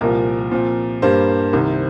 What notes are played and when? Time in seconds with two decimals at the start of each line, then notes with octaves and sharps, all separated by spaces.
0.01 C2 A#2 F3 A#4
0.51 A#2 F3 C4
1.02 G2 G3 A#3 C5
1.53 C2 C3 D#3